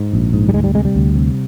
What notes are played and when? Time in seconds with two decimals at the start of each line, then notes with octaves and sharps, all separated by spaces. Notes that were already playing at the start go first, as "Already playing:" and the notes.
Already playing: G#2
0.13 A#1
0.33 G#2
0.49 G3
0.53 D2 G#3
0.64 G3
0.74 C3 G#3
0.85 G3
0.95 D2
1.15 C3